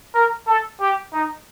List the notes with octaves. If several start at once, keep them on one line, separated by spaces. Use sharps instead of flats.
A#4
A4
G4
D#4